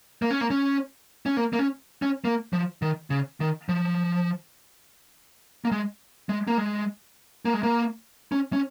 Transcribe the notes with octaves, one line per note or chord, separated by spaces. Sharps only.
A#3
C#4
A#3
C#4
C#4
A#3
A#3
C#4
C#4
A#3
F3
D#3
C#3
D#3
F3
A#3
G#3
G#3
A#3
G#3
A#3
G#3
A#3
C#4
C#4